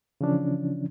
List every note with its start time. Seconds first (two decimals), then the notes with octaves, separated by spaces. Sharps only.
0.21 C#3 E3 F3 C#4 D4